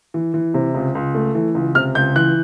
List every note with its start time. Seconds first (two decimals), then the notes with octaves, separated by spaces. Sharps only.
0.14 E3
0.34 E3
0.54 C3
0.74 C#2
0.95 C#2
1.15 A3
1.35 E3
1.55 C#2
1.75 C3 F6
1.95 C#2 G6
2.16 E3 F#6